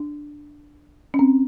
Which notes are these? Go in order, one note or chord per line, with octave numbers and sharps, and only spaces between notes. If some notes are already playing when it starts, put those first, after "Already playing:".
Already playing: D4
C#4
C4